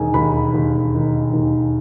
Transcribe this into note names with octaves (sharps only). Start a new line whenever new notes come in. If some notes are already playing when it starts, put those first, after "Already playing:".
Already playing: E1 D#3 G#5
D#2 B5
D#2
D#3
D#2